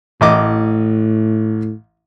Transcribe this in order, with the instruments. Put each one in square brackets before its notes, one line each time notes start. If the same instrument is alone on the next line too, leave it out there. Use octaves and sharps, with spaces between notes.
[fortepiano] A1 D#5 D6 [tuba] A2